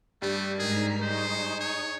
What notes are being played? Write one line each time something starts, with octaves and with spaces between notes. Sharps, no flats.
G2 A3 G4
G#2 D#3 G#4 A#5 B6
D#4 G#4 C5 C#6 D#6
C#5